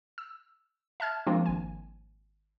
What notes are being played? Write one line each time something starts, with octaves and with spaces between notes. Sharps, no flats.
E6
E5 A5 F6 G#6
F3 G#3 A#3 C4 D4 F4
G#1 G#5